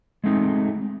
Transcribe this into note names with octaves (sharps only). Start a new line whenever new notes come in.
G#3 A3 C4 D#4